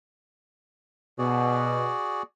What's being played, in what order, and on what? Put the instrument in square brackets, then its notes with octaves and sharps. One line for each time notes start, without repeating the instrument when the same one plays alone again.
[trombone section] B2 [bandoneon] F#4 G#4 D5